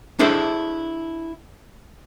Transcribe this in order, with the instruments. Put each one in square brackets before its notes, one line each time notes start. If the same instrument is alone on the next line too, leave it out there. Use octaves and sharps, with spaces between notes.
[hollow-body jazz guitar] D4 E4 G#4 A4 C5 E5